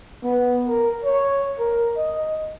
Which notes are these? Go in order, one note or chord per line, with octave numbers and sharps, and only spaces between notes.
B3
A#4
C#5
A#4
D#5